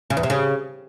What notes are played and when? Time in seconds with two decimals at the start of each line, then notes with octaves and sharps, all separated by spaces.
0.10 C#3
0.17 E2
0.23 C3
0.30 C#3